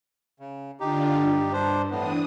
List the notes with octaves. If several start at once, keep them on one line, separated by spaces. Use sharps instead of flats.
C#3
D3 D4 D#4 F4 G4
G2
D4 C5
A2 E3 B3 D4 D#6